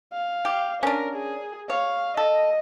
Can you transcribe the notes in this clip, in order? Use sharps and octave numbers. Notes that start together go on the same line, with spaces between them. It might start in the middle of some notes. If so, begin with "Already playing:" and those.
F5
G4
C#4 D4 A#4
G#4
C#5 F5
A4 D#5